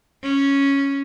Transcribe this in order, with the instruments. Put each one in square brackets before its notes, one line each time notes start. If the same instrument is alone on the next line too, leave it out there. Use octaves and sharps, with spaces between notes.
[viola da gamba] C#4